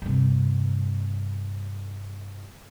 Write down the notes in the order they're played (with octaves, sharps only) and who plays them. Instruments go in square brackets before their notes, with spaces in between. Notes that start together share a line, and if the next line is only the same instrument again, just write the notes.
[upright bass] G2 C3